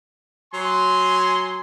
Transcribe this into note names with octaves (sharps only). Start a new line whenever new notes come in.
F#3 G#5 C6